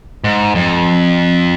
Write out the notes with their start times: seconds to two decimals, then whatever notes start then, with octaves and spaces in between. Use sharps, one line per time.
0.24 G#2
0.55 F2